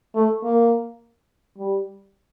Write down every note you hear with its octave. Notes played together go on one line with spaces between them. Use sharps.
A3
A#3
G3